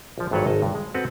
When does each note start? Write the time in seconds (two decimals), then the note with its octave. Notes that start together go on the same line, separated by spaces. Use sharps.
0.18 A#1 F3
0.31 G#1 G2 F#3 A4 B4 C#5
0.47 G#1 D#5 A5
0.62 G2
0.75 G#3
0.94 C4 F#4 A4 B4